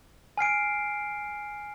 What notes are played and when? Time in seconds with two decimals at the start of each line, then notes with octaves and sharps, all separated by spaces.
0.37 G#5 F6 C7 D7